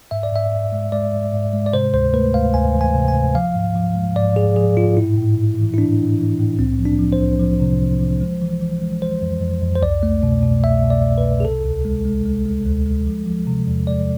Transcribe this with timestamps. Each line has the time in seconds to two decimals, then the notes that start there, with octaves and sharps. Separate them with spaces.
0.11 G#2 E5
0.23 D5
0.32 G#2 E5
0.52 G#2
0.72 G#3
0.92 G#3 D5
1.13 G#2
1.33 G#2
1.53 G#3
1.66 D5
1.73 C3 C5
1.94 D2 C5
2.14 A3 B4
2.34 D2 F5
2.54 D2 G#5
2.74 E3
2.81 G#5
2.95 C3
3.08 G#5
3.15 C3
3.35 F3 F5
3.56 G#2
3.76 F3
3.96 G#3
4.16 G#2 D5
4.36 G#2 G#4
4.56 F3 G#4
4.76 G#2 F4
4.97 A2 E4
5.17 A2
5.38 A2
5.58 E3
5.74 E4
5.78 E3 D4
5.98 A2
6.18 E3
6.39 A2
6.59 C2 C4
6.79 F3
6.86 D4
6.99 F3
7.12 C5
7.19 C2
7.40 F3
7.60 C3
7.80 C2
8.00 F3
8.21 G#3
8.41 E3
8.61 E3
8.82 G#3
9.02 G#3 C5
9.22 F2
9.42 F2
9.62 F2
9.76 C5
9.83 C2 D5
10.03 A3
10.23 B2
10.43 B2
10.64 C2 E5
10.84 B2
10.90 D5
11.04 C2
11.18 B4
11.24 C2
11.40 G#4
11.45 C3 A4
11.65 D2
11.85 G#3
12.05 G#3
12.26 G#3
12.45 G#3
12.66 D2
12.86 G#3
13.07 F3
13.26 F3
13.47 C3
13.67 E2
13.87 G#3 D5